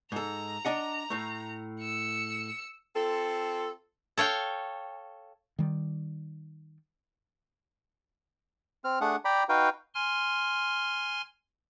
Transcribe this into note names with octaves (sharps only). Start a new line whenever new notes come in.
G#2 A4 A#5
D4 D#5 F#5
A2 A3
E6 C#7
C4 F4 A4
A4 C#5 F5 G5
D#3 G3
C4 F6
A3 D4 G#4 F#5
D5 G5 A#5 B5
D#4 F#4 B4 F5 G5
G#5 C6 F6